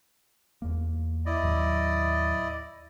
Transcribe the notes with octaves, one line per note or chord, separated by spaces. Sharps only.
E2 A#3
E4 D5 D#5
D#2 A2 F#3